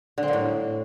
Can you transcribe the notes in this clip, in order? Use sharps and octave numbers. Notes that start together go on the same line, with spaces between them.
D3
C4
A#3
A2